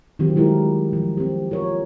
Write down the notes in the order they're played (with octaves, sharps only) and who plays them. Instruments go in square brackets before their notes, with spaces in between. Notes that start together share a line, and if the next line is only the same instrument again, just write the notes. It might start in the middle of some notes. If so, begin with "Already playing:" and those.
[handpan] D#3 F#3 C4 F4 G4
G3 G#3 E4 G4 A#4
F3
C4 G4
F4 A#4 C#5